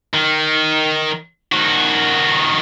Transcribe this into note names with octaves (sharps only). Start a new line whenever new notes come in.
D#3
D#3 F#4